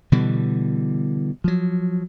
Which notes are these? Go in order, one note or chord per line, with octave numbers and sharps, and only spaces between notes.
B2 D3 E3 G3
F3 F#3